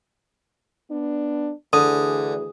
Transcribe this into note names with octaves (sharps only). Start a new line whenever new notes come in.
B3 D4
D2 D3 E3 G#4 D#6